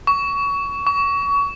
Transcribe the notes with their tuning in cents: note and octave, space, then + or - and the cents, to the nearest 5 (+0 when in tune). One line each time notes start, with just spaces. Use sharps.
C#6 +25
C#6 +30